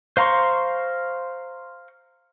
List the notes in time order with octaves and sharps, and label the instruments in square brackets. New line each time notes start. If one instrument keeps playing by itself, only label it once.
[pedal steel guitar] C5 F5 A#5 C6 C#6